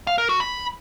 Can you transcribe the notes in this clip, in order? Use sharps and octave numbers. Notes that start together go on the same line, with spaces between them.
F5
A#4
F#4
B5